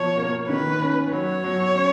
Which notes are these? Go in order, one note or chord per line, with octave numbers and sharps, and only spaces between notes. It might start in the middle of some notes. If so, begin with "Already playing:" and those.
Already playing: B2 F3 C#5
A#3
D#3 B4
C#4
F#3 C#5
F#3
C#4